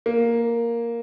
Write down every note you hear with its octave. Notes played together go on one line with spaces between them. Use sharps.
A#3